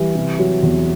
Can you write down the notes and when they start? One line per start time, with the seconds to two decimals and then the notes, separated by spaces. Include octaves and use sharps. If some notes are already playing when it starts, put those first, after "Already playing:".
Already playing: E3 G3
0.15 C3
0.39 F#3
0.63 E2